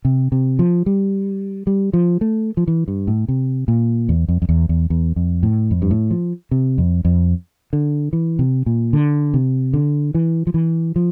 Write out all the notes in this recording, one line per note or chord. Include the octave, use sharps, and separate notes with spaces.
C3
C3
F3
G3
G3
F3
A3
F3
E3
G2
A2
C3
A#2
E2
F2
F2
E2
E2
E2
F2
A2
F2
G2
A2
F3
C3
F2
F2
D3
E3
C3
A#2
D3
C3
D3
E3
F3
E3
F3